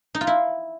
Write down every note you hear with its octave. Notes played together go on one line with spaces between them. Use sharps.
D#4
F4
E4